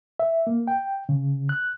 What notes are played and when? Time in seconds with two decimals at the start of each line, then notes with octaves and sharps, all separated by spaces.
0.20 E5
0.47 A#3
0.67 G5
1.09 C#3
1.49 F#6